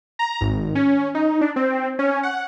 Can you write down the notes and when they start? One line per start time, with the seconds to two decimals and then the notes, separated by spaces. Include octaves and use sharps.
0.19 A#5
0.41 G#1
0.75 C#4
1.15 D#4
1.41 D4
1.56 C4
1.99 C#4
2.23 F#5